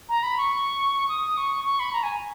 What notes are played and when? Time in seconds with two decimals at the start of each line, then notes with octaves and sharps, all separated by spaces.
0.09 A#5
0.23 B5
0.38 C#6
1.09 D#6
1.37 C#6
1.65 C#6
1.80 B5
1.93 A#5
2.03 G#5